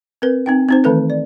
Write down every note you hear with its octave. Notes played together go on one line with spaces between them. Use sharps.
C4 A#4 B4
C4 D#4 G5
C4 D#4 C5
D#3 E3 A3 A4 B4
D5